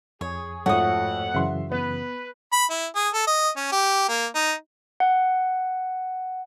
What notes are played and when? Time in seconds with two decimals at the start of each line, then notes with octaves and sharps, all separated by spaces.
0.21 F2 G#4 C#5
0.66 F2 G#2 F3 A3 F#4 C#5 F#5 D#6
1.35 F#2 C#3 E3 E5 C6
1.72 B3 B4
2.53 B5
2.70 E4
2.96 G#4
3.14 A4
3.27 D#5
3.57 C#4
3.72 G4
4.09 A#3
4.35 D#4
5.00 F#5